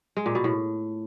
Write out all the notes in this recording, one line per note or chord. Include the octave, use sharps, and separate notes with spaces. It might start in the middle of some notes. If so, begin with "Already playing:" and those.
G#3
A#2
B2
A2